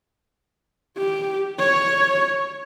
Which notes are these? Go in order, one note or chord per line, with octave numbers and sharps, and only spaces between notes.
G4
C#5